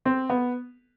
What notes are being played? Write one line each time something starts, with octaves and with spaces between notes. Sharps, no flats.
C4
B3